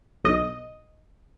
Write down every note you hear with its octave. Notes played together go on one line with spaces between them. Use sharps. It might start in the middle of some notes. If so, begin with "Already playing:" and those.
B1 D#5